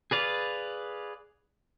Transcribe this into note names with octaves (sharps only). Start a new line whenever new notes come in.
G#4 B4 D5 F5